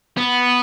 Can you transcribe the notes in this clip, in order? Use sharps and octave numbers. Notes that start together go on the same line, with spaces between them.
B3